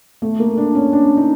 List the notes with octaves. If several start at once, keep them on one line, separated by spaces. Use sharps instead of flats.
A3
A#3
D4
C#4
D4
D#4